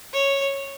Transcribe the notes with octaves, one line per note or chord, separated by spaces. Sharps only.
C#5